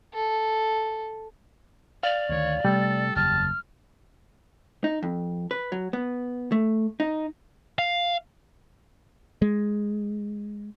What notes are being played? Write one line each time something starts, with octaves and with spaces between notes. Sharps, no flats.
A4
D5 F5
D2 D#3 C#5
C3 G3 A3 A4
F#1 E2 A5 F6
D#4
F2
B4
F#3
B3
A3
D#4
F5
G#3